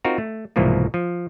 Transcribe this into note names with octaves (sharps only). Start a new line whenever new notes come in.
C4 D#4 F4 F#4 A#4
A3
C2 G#2 B2 E3 F3 A#3
F3